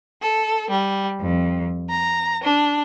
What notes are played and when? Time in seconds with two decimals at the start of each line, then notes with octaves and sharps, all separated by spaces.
0.21 A4
0.70 G3
1.20 F2
1.89 A#5
2.44 D4